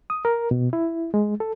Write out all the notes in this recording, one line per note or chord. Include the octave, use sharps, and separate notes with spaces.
D#6
A#4
B2
E4
G#3
A4